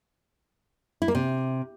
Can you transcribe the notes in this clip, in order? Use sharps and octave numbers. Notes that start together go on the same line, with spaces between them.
E4
A#3
C3